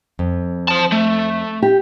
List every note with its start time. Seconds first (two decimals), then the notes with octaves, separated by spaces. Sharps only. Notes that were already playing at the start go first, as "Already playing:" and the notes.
0.19 F2
0.68 C5 A5
0.92 A3
1.62 G4